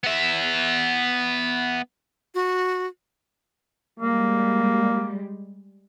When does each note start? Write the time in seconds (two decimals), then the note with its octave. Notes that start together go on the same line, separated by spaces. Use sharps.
0.03 B3 E5
2.35 F#4
3.99 G3 G#3 A#3